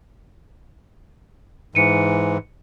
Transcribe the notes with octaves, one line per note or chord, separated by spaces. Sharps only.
G#2 E3 C#7 D#7